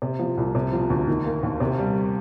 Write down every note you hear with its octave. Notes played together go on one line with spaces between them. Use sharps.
C3
F3
C2
C3
F3
D2
D#3
A#3
D#2
C3
G3